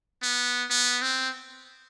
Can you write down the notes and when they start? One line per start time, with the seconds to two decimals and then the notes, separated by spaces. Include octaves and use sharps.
0.23 B3
0.70 B3
1.02 C4